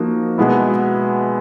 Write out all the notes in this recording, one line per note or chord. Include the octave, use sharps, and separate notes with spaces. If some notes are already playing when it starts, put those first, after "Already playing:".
Already playing: F3 A#3 D#4 F#4
B2 G#3 B3 E4